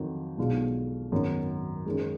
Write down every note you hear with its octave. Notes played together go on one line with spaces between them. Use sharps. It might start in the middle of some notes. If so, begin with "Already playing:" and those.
Already playing: F2 D#3 F#3
B1 B2 G#3 D4 F4
G#1 F#2 D#3 F#3 B3
F#2 D#3 G#3